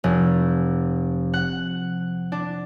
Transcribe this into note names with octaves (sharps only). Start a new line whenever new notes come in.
F1
F#5
D4